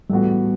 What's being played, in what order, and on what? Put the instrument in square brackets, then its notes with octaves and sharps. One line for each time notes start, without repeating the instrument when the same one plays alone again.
[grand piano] A2 E3 B3 F#4 [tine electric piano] G3